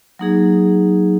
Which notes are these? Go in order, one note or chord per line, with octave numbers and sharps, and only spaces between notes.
F#3 A#3 D#4 G#4